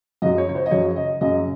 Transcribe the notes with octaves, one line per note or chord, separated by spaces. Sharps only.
F#2 C#3 F#3 D#5
C#5
C#5
C5
D#5
F#2 C#3 F#3 C#5
D#5
F#2 C#3 F#3 D#5